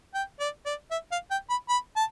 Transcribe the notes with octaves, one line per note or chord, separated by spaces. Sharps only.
G5
D5
D5
E5
F5
G5
B5
B5
A5